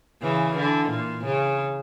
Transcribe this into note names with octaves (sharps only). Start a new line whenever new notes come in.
C#3 E3
D3
A#2
C#3